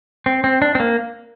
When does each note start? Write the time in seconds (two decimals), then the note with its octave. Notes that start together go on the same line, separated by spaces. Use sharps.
0.26 C4
0.44 C4
0.62 D4
0.75 C4
0.80 A#3